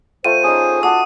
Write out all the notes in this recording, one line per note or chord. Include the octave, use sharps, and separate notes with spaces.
A3 F4 C5 G5 D#7
C#4 D#4 G#4
F#4 F#5 A5 D6 D#6